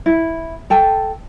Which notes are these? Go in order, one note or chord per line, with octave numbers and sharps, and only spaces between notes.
E4
A4 G5 A5